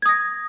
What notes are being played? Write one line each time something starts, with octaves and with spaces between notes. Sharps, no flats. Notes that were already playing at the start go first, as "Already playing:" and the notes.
D#6 G#6 A#6